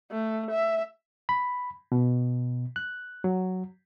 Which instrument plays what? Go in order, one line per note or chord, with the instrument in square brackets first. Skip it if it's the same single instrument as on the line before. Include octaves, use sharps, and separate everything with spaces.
[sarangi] A3
E5
[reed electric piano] B5
B2
F#6
F#3